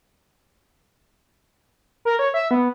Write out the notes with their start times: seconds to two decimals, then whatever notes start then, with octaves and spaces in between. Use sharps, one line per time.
2.05 A#4
2.19 C#5
2.34 E5
2.51 B3